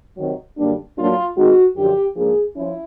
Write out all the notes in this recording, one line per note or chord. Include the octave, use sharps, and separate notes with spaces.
C3 D#3 F#3
F#2 D3 G3 A#3 D4
A2 F#3 A#3 D4 F4
D#3 G#3 C4 D#4 F#4
F#2 D3 F3 G4
G#2 F3 A#3 D4 G#4
F3 C#4 E4